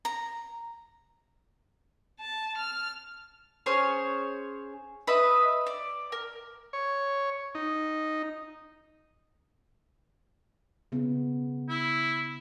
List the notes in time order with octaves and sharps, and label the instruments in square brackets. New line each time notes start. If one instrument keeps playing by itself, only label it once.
[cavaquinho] A#5
[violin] A5
F6
[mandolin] C#4 G#4 C5 C#5
B4 D#5 E5
D5
A#4
[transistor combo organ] C#5
D#4
[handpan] C#3 B3
[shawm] E4